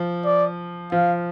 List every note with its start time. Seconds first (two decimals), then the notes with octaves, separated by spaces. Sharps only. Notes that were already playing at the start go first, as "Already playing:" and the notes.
Already playing: F3
0.25 D5
0.92 F3 F5